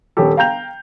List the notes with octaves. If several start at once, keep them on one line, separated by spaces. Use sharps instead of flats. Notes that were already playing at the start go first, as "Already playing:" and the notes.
D#1 C#4 G4 A4
F5 G5 A#5 G6 F7